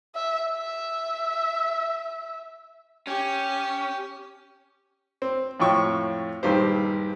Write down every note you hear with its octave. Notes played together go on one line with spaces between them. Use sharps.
E5
E5
C#4 G4
C4
F2 A2 F4 G5 C#6 E6
A#1 G2 D#3 G4 C5